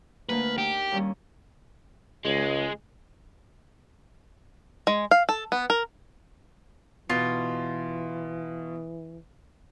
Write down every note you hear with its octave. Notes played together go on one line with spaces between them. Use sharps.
D2 A#3 B4
D#4 G4
D#2 G3 C#4
C#2 G#3
G#3
F5
A4
B3
A#4
B2 E3 F4